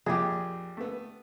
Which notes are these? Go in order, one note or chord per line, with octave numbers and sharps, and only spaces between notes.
A#1 F2 G4 G#4
A3 B3